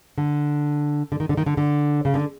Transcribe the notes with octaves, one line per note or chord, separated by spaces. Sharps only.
D3
D3
D#3
D3
D#3
D3
D3
C#3
D3